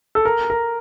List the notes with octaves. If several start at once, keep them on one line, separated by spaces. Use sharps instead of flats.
A4
A#4
A#4